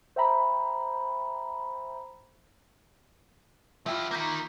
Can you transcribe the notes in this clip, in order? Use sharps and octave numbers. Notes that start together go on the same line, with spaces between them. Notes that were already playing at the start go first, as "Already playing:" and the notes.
C5 E5 G5 A#5 B5
F3 E4 F4 G4
D#3 A#3 A#5 G6 B6